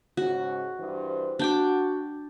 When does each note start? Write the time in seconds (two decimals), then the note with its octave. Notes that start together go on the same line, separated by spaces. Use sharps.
0.17 G#2 C#3 F#4
0.79 G2 E3 C5
1.39 D4 F#4 G5 D6